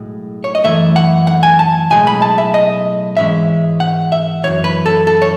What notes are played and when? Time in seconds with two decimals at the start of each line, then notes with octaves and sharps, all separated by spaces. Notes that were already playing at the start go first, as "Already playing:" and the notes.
Already playing: B1 A2 G#3
0.44 C#5
0.55 D#5
0.64 F#2 E3 A3 E5
0.96 F#5
1.27 F#5
1.43 G#5
1.59 A5
1.90 B1 A2 G#3 G#5
2.07 B5
2.22 A5
2.38 E5
2.54 D#5
3.17 G#2 E3 G#3 C#4 E5
3.80 F#5
4.12 E5
4.43 F#2 C#3 E3 C#5
4.64 B4
4.86 A4
5.07 A4
5.22 C#5